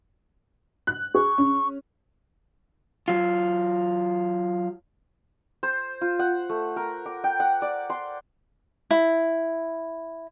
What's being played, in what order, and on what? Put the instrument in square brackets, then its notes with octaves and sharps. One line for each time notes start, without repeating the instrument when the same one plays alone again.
[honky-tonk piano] F#6
[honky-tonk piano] G#4 [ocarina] C#6
[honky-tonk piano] C#4
[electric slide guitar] F#3 F4
[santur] C5
F4
F#5
A3
A#4
D6
G5
F#5
D5
C6
[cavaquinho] E4